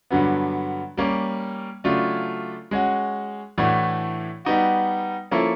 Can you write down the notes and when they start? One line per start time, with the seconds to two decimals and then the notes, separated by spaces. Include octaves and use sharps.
0.11 G2 D3 F#3 B3
0.97 G3 A#3 C#4
1.84 C#3 F#3 A3 D4 F4
2.71 G#3 C#4 F#4
3.58 A2 E3 A3 D4 F#4
4.45 G3 B3 D#4 F#4
5.31 F3 A#3 C#4 E4 A4